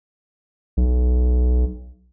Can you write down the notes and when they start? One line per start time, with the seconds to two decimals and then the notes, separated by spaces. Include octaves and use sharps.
0.77 B1